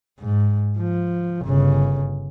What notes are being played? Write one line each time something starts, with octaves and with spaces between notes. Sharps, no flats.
G#2
F3
G1 C#3